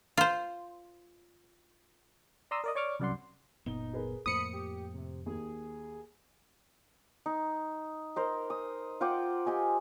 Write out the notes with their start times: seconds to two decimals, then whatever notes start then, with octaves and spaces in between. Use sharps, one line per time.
0.17 F4 C5
2.51 D5 A#5 C6 D#6 E6
2.64 A#4 D5 D#5
2.75 C#5 D5 C#6 D6 F6
3.00 C2 F#2 D5 F#5 C6
3.66 F#1 A#2 B3 D#4 G7
3.93 G#4 A#4 B4
4.26 F2 A2 A#3 C5 B5 D#6 C#7
4.53 G4
4.94 C3
5.26 D#2 G#4
7.26 D#4
8.16 A#4 C5 D#5
8.50 D#6
9.01 F4 F#5 G5 D6
9.46 G4 D#5 G#5